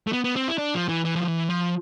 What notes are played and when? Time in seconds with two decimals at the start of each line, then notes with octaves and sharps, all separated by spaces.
0.07 A3
0.13 B3
0.24 B3
0.36 C4
0.48 E4
0.58 D4
0.74 F3
0.88 E3
1.05 E3
1.15 F3
1.28 E3
1.49 F3